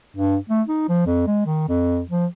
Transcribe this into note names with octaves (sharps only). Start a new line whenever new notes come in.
G2
A3
D#4
F3
F2
G#3
D#3
F2
F3